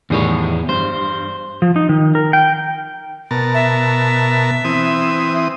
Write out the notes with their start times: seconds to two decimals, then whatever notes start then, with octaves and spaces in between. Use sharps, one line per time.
0.10 E2 A2 D#3 G3 G#4 C#5
0.69 G2 C5
1.62 F3
1.76 D#4
1.89 D#3
2.15 A#4
2.33 G5
3.31 B2 A#4 A5
3.54 E5
4.65 E3 C4 D#6